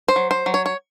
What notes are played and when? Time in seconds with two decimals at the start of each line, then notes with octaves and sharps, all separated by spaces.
0.08 C5
0.16 F#3
0.31 C5
0.46 F#3
0.54 C#5
0.66 C#5